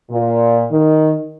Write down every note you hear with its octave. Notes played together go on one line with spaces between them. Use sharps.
A#2
D#3